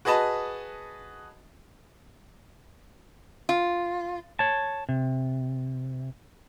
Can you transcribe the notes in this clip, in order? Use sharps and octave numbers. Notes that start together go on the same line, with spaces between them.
F#4 G#4 B4 D#5 A5
F4
C#5 A5
C3